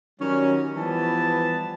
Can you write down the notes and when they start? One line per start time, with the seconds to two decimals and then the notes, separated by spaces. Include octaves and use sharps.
0.21 D#3 F#3 G3 C#4
0.76 E3 F3 G3 B3 A5